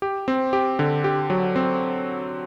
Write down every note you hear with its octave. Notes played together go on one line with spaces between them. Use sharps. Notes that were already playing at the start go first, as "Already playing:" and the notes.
G4
C4
G4
D3
G4
F#3
C4